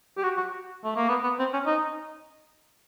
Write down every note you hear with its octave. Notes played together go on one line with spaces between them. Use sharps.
G4
F#4
F#4
A3
A#3
B3
B3
C4
C#4
D#4